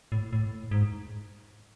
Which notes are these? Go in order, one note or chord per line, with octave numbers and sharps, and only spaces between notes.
A2
A2
G#2